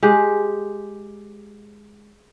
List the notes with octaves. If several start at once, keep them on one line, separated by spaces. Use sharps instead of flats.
G#3 G4